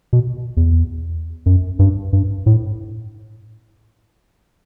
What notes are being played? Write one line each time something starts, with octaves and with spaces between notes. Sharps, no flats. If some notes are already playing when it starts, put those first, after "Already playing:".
B2
E2
F#2
G2
G2
A2